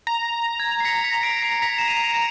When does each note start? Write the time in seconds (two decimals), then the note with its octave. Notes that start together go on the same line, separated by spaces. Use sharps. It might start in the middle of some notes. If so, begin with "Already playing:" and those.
0.07 A#5
0.60 G#6
0.80 C7
0.85 B6 C#7
1.04 B6 C#7
1.23 C7 D7
1.42 C7 D7
1.62 B6 C#7
1.78 E7
1.88 D#7 F7
2.05 F7
2.14 D7 E7